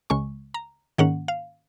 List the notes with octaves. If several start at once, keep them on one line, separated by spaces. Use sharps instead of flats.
C#2 C#3 G#3 C#6
A#5
G#2 D#3 A#3 C#4 F#5
F5